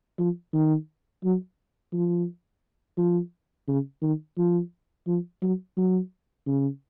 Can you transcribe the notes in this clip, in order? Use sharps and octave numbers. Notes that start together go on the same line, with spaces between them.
F3
D#3
F#3
F3
F3
C#3
D#3
F3
F3
F#3
F#3
C#3